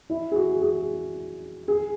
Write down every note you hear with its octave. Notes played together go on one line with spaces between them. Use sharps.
E4
G#4
F#4
G#4
G#4